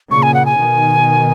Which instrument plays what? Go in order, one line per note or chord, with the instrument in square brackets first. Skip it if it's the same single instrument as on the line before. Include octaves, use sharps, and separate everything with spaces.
[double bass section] A#2 C#3 [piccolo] C#6
[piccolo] G#5
F#5
G#5
[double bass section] B2 D#3